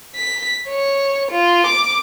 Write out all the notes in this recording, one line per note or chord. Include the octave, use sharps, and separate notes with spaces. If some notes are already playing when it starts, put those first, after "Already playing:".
B6
C#5
F4
D6